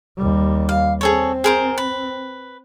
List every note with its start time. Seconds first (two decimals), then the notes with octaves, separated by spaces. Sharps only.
0.17 D#2 G3
0.69 F5
1.01 C4 G#4 A4 C#5
1.44 G#4 A#4 C5
1.78 B4